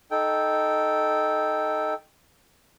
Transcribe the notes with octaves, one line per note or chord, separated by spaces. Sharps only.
D#4 A4 G5